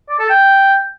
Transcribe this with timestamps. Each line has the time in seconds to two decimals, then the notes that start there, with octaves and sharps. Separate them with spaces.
0.09 D5
0.19 A4
0.29 G5